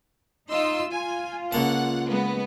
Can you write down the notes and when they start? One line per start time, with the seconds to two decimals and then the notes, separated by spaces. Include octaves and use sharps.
0.48 D#4 F4 C6 E6
0.90 F4 G#5
1.52 C#2 A#3 F#5 A5
2.09 G#3 B3